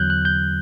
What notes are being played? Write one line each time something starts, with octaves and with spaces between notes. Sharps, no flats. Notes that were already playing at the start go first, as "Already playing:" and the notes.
Already playing: E2 D3 F#3 F#6 G6
F#6
G6